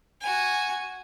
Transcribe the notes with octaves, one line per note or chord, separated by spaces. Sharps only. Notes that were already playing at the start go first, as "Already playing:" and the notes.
F#4 G#5